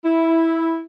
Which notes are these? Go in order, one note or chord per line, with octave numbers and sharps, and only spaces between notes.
E4